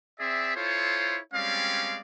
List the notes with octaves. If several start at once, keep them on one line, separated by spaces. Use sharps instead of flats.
C4 G#4 D5 E5
E4 F4 A4 C5 C#5
G3 G#3 C4 C#4 D5 F5